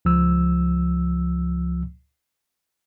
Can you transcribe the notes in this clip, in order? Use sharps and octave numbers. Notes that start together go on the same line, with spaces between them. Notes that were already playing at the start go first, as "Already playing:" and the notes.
C#2 F3 E6